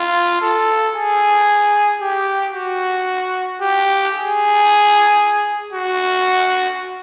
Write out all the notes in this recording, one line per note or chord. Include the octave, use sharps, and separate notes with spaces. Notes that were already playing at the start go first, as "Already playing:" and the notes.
Already playing: F4
A4
G#4
G4
F#4
G4
G#4
F#4